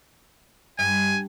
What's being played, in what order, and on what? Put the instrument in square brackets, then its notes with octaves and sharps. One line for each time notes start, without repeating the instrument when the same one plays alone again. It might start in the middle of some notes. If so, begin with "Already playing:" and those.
[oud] G2 [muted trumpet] G#5